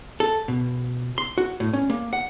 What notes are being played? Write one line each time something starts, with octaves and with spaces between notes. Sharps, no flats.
A4
B2
C6
F#4
A2
C#4
A#3
F#5